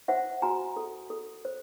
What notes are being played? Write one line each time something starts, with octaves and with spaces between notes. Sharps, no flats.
C5 E5 F#5
F#4 G#5 A#5
A4
A4
C5